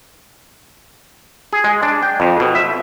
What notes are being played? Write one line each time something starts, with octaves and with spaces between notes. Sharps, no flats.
G#4
G#3
D4
G5
F2
B2
E5